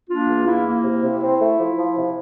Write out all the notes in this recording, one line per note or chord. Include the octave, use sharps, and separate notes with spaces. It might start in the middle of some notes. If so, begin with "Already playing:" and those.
A#3 D4 F4
E2
A#3 E4
A#3
C3
C3
C4
A3
F3
F3
C3